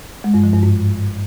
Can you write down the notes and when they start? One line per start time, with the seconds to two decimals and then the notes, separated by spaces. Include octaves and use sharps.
0.24 G#3
0.34 G2
0.44 F3
0.53 G2
0.63 G#2